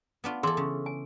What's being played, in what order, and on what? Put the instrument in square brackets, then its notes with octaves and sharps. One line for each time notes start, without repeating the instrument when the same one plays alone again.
[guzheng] B3 D4 F4
[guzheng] E3 A4 [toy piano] G#4 C6 D6
[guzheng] C#3
[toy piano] G#5